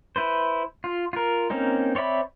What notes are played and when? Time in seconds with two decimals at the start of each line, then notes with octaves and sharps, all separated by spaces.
0.16 E4 B4 C5
0.84 F4
1.13 F4 A#4
1.50 A#3 C4 C#4 D#4
1.95 C4 C#5 D5 E5 B5